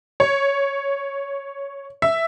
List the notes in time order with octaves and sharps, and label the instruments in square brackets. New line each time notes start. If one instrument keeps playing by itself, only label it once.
[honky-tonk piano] C#5
E5